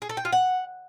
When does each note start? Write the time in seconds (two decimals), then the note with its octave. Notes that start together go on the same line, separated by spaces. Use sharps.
0.02 G#4
0.09 A4
0.17 G5
0.25 F4
0.33 F#5